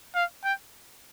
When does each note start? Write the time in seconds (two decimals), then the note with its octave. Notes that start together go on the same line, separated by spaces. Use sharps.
0.15 F5
0.44 G5